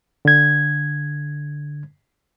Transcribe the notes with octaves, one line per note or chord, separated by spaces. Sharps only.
D3 G#6